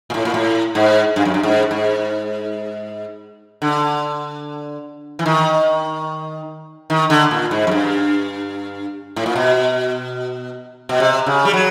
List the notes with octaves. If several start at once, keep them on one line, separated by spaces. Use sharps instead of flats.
A#2
A2
A#2
A2
G#2
G2
F#2
G2
G#2
G#2
D3
E3
D#3
D#3
D3
A#2
G#2
F#2
G2
A2
A#2
B2
B2
C3
C#3
G3
F#3